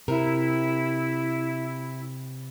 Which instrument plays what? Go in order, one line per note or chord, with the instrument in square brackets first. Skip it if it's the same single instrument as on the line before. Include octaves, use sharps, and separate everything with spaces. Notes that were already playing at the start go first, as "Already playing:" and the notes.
[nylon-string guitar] C3 A#4 [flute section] E4